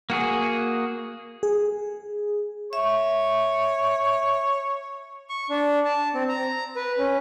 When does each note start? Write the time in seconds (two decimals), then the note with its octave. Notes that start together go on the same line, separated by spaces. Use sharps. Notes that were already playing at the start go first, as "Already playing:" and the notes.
0.10 A#3 F#4 G#4
1.43 G#4
2.73 C#5 E5
5.29 C#6
5.50 D4
5.85 A5
6.14 C4
6.29 A#5
6.76 B4
6.98 C#4